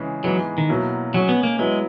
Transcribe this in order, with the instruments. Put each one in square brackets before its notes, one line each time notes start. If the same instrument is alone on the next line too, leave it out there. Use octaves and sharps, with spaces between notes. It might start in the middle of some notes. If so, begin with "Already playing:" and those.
Already playing: [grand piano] C#3 E3 G#3
[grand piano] G#2 E3 G#3 B3 [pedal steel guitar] F#3
[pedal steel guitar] D#3
[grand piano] B2 F#3 A#3 E4
[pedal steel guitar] F#3 [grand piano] G#3 C#4 G#4 C#5
[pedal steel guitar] B3
A#3
[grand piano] F#3 B3 E4 [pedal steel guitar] G#3